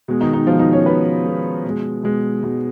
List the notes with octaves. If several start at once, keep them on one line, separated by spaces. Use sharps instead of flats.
B2 G#3
D#3 D#4
D#3 D#4
B2 F3 G#3 F4
D#3 D#4
C#4 C#5
B2 G#3 B3 B4
B2 G#3
B2 G#3
B2 G#3
B2 G#3